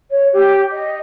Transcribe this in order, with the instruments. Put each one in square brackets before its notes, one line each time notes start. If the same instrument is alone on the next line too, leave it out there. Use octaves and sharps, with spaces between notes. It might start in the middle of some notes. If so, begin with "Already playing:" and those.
[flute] C#5
G4
D#5